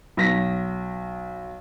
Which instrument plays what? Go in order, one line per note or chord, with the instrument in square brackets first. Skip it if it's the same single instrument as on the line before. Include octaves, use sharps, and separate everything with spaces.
[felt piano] B1 A#6 B6